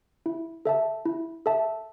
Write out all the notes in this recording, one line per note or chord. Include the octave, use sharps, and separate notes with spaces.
E4
A4 E5 A5
E4
A4 E5 A5